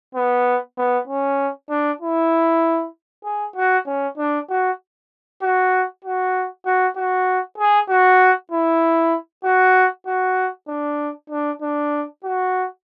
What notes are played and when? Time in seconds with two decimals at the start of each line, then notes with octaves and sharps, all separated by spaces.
0.15 B3
0.78 B3
1.08 C#4
1.70 D4
2.01 E4
3.24 G#4
3.56 F#4
3.86 C#4
4.18 D4
4.49 F#4
5.42 F#4
6.04 F#4
6.66 F#4
6.97 F#4
7.58 G#4
7.89 F#4
8.52 E4
9.44 F#4
10.06 F#4
10.68 D4
11.30 D4
11.62 D4
12.24 F#4